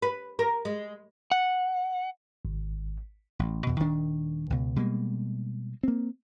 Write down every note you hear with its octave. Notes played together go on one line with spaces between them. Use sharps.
B4
A#4
G#3
F#5
G#1
A1
E2 B2
D#1 D#3 D4
C#2 B2
B2 G3 G#3 A#3
A#3 C4